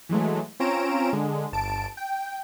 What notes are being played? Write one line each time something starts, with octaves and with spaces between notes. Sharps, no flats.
E3 F#3 G#3 A3
C4 C#4 F4 A#5 D7 E7
D3 G#3
G1 A5 D7
G5